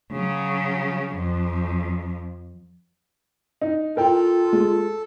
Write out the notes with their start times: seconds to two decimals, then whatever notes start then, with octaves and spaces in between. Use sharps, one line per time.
0.11 C#3 F#3
1.15 F2
3.61 D#4
3.97 F4 A4 A#4 G5 A5
4.53 G#3